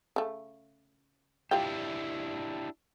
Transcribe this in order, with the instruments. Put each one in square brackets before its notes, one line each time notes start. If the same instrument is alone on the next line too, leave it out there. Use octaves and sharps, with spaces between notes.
[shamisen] C#3 A3
[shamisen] G3 F4 G5 [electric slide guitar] D4 E4 G4